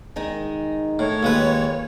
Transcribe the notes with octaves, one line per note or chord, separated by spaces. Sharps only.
D#3 G#3 D#4
A2 C#5
D#2 A#2 G#3 B4